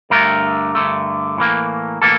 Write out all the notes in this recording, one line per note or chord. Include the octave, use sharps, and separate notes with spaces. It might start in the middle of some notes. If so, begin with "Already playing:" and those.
G2 D3 A3 A#4
G2 D3 A3
A2 E3 A#3
A2 E3 A#3 A4